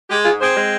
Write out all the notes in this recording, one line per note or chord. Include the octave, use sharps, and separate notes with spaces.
G#3 G4
G#2 F4 G#4
C4 G#4 C5
G#3